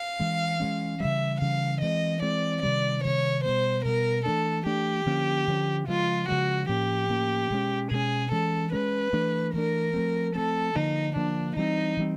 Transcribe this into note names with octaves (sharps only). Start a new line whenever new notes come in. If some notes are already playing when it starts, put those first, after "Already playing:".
Already playing: F5
E3 G#3 C#4
E3 G#3 C#4
C#3 E3 G3 E5
C#3 E3 G3 F5
E3 G#3 C4 D#5
E3 G#3 C4 D5
C3 D#3 G3 D5
C3 D#3 G3 C#5
B2 G3 B3 C5
B2 G3 B3 A#4
E3 A3 D4 A4
E3 A3 D4 G4
D3 F3 A#3 C#4
D3 F3 A#3 C#4
C#3 F3 G#3 F4
C#3 F3 G#3 F#4
A2 F3 A#3 C#4 G4
A2 F3 A#3 C#4
B2 G#3 C#4
B2 G#3 C#4 G#4
E3 G#3 C#4 A4
E3 G#3 C#4 B4
E3 A3 D4
E3 A3 D4 A#4
F3 A3 C4
F3 A3 C4 A4
D3 F3 A#3 D#4
D3 F3 A#3 D4
E3 G3 C4 D#4
E3 G3 C4